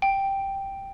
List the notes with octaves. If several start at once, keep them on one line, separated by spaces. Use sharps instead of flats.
G5